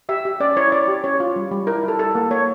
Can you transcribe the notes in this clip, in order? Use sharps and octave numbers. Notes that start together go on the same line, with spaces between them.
G4 E5
G4
C#4 D5
E4 C#5
E4 D5
G4
C#4 C#5
F4
G3
G3
E4 A#4
E4
A4
E4 A4
A#3
A#3 C#5